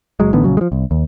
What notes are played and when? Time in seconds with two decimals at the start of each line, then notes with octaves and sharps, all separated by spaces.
0.20 F#1 F#3 G#3
0.33 A1 D3 D#3 B3
0.44 A#1 C#3 F#3
0.57 F3 G#3
0.72 C2
0.91 D#2